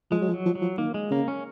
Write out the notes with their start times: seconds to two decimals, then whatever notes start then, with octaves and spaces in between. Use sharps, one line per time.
0.11 F3 G#3
0.21 F#3
0.28 F3
0.34 F#3
0.45 F3
0.55 F#3
0.62 F3
0.78 D#3 A#3
0.94 G#3
1.11 C#3 A#3
1.28 C#4